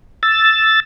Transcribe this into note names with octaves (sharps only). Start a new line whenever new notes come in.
E6 A6